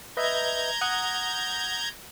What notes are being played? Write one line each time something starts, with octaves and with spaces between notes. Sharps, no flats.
B4 D#5 E5 A#5 G6 G#6
F#5 D#6 F#6